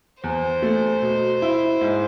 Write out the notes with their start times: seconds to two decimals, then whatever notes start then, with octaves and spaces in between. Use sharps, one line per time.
0.23 E2 C5
0.62 A3
1.02 B2
1.42 E4
1.81 G#2